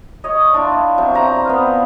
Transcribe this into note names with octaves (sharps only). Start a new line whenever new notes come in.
C#5 D#5
D4 E4 F4
C3 F#3
C3 C5 A#5
B3 B4 F5